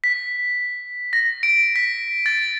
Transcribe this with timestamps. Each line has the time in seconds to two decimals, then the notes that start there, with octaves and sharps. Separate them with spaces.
0.04 B6
1.13 A#6
1.43 D7
1.76 B6
2.26 A6